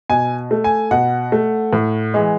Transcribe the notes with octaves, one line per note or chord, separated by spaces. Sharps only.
B2 G#5
A3
G#5
B2 F#5
A3
A2
E3 G#3